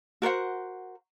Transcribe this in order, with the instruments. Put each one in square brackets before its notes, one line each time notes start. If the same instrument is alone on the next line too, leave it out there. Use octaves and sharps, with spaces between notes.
[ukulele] F#4 A#4 C5 F#5